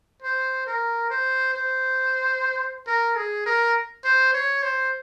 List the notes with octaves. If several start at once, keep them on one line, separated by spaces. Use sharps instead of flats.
C5
A#4
C5
C5
A#4
G#4
A#4
C5
C#5
C5